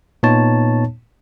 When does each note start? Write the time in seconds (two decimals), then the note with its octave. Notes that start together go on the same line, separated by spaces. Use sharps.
0.23 A#2 B3 D#4 C#5 A5